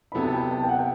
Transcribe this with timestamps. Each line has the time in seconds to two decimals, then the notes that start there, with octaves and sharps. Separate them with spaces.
0.12 C3 F#3 B3 E4 A4 B5
0.22 A5
0.33 G5
0.51 A5
0.63 G5
0.69 F#5
0.79 G5